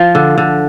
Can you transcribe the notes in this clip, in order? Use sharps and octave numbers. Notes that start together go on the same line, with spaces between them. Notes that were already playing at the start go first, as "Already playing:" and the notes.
Already playing: F3
D3
D3